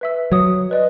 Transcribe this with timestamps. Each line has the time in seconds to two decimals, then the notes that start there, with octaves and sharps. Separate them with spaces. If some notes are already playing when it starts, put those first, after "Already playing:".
0.01 B4 E5 E6
0.32 F#3 C#5 D#6
0.71 B4 D5 D#5 F#6